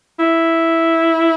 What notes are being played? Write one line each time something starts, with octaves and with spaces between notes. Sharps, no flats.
E4